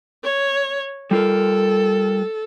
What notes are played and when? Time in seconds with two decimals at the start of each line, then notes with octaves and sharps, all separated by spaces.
0.24 C#5
1.11 G3 F4 A4 A#4